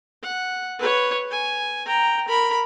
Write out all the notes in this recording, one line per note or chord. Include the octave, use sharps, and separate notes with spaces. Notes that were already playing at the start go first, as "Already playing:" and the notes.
F#5
B4 C#5
G#5
G5 A#5
A#4 B5